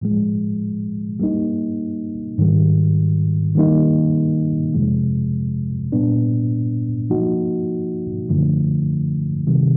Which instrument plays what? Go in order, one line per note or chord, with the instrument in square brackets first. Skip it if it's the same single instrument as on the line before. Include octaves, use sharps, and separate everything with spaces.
[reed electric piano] A2 F3 G#3
G3 A#3 D#4
G#2 D#3 G3
D#3 G3 A#3 D#4
F2 C3 F3 G#3
A#2 G3 B3 D4
F3 A#3 D#4 F#4
F#2 D3 F3 A3
C3 D#3 G3